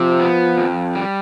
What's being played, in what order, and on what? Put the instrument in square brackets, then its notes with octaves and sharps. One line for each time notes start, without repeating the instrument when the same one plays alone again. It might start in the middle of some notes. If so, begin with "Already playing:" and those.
Already playing: [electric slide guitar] C3 [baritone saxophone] F3
[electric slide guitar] B3
F2
G3